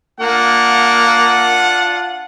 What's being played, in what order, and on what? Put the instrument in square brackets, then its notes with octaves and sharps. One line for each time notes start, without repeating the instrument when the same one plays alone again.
[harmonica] A#3 [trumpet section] D4 F4 F#5